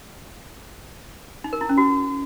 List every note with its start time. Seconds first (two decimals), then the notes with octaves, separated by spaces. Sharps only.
1.44 D#4
1.53 A#4
1.61 E4
1.69 C#4
1.78 F#4